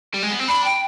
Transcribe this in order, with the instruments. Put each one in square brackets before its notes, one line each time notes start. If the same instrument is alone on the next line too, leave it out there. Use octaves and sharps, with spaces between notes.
[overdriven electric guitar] G3
G#3
B3
C4
[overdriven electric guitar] D4 [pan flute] B5
[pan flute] G5